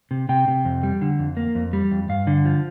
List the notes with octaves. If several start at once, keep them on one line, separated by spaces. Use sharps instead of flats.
C3
C3 G5
C3
F2
G3
D3
F2
A#3
F2
G3
F2
G2 F5
D3
F3